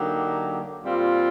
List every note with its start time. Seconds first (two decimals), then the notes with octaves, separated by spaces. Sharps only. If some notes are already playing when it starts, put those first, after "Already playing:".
Already playing: D3 F#3 A#3 D#4 G4
0.83 A#2 G3 C4 F4